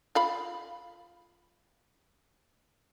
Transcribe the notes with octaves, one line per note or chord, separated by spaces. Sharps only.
F4 F5 B5